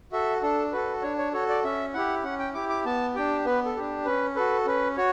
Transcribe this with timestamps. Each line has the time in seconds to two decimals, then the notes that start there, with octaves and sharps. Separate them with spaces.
0.12 F#4 A4 E5
0.42 D4 A4
0.72 F#4 A4 B4
1.02 D4 C#5
1.18 C#5
1.33 F#4 A4 C#5
1.49 D5
1.64 C#4 E5
1.94 E4 G4 F#5
2.24 C#4 F#5
2.39 G5
2.54 E4 G4 D6
2.69 D6
2.85 B3 A5
3.15 D4 G4 G5
3.45 B3 B4
3.65 A4
3.76 D4 G4
4.05 C#4 B4
4.36 F#4 A4 B4
4.66 C#4 B4
4.96 F#4 C#5